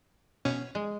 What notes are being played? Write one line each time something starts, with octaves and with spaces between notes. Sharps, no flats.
B2 C#4
G#3